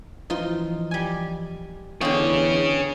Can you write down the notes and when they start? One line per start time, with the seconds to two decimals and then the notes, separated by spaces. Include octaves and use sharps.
0.30 E3 F3 D#4 F4
0.91 G3 G#5
2.01 E2 D3 F4 G#4 C#5 D#5 G5 C#6